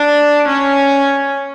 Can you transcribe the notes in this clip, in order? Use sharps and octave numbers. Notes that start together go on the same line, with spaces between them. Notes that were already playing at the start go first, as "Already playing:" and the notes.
Already playing: D4
C#4